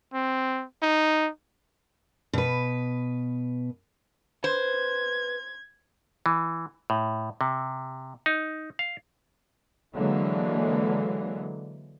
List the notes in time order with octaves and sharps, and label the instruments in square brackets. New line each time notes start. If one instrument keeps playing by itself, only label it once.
[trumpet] C4
D#4
[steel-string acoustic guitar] B2 B4
[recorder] B4 [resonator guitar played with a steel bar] C5 [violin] G#6
[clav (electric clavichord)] E3
A2
C3
D#4
F5
[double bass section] D3 E3 F#3 G#3 A#3